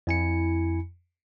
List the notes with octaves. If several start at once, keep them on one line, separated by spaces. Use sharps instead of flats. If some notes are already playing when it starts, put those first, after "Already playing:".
F2 E4 G#5 C#7